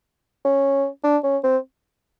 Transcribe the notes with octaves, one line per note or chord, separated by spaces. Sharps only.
C#4
D4
C#4
C4